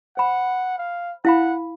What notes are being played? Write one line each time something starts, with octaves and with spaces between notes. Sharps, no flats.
C5 F#5 B5
F5
E4 F5 F#5 B5